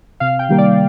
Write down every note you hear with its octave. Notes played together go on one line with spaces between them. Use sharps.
C3 F5
G5
D#3 G3 A#3
D5